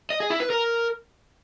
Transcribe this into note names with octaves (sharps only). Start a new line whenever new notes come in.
D#5
G#4
E4
B4
A#4